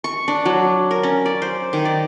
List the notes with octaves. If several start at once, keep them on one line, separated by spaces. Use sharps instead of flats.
C#6
D4
F#3
A#4
C#4
D5
C5
D#3
D5